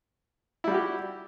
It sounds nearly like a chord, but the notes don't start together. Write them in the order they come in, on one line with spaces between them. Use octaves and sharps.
E4 G3 F#4 G4